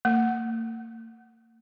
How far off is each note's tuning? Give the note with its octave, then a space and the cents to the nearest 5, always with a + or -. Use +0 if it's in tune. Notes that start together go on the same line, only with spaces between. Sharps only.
A#3 -45